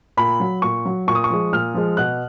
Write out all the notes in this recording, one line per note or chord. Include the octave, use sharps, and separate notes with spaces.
A#2 B5
F#3
A#2 C#6
F#3
A#2 C#6
D#6
C#6
F3 G#3
A#2 F6
F3 G#3
B2 F#6